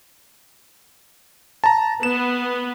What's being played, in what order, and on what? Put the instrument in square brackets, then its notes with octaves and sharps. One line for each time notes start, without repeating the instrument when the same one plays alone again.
[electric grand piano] A5 A#5
[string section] B3 [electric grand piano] E7